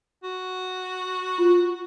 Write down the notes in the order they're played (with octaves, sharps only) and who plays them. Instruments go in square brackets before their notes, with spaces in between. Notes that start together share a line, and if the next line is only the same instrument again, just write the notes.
[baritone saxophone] F#4
[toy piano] F4